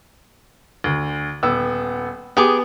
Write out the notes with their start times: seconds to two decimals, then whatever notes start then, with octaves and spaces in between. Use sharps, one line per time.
0.84 D2
1.43 D#1 B3 E6
2.37 B3 G4 G#4 D6